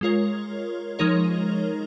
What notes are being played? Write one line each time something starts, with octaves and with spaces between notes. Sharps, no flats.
G#3 F4 A#4 C#5
F3 G#3 D#4 A#4 C#5